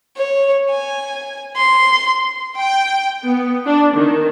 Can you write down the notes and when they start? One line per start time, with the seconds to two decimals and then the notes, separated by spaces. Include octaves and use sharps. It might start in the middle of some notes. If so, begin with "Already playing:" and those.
0.17 C#5
0.70 G#5
1.56 C6
2.56 G5
3.25 B3
3.66 D4
3.96 D#3